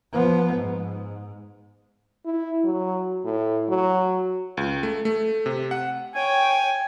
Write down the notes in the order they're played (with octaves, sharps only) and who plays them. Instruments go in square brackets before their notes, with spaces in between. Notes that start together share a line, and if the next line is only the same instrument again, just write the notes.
[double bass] F3 B3
G#2
[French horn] E4
F#3
A2
F#3
[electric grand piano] C#2
A3
A3
C3
F#5
[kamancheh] C#5 G5 [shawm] G#5